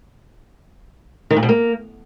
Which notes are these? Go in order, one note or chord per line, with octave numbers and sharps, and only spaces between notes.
D#3
A#2
B2
A#3